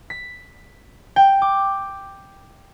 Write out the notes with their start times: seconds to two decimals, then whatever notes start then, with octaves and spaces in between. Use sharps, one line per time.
0.10 B6
1.16 G5
1.42 D6